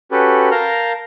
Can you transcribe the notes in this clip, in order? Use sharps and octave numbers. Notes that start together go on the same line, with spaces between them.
C#4 F#4 G4 A4 B4
A#4 F5 A5 A#5 F6 G6